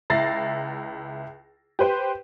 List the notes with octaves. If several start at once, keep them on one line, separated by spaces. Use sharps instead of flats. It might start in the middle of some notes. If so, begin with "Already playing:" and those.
C#2 E4 A6 A#6 C7
G4 B4 C5 G5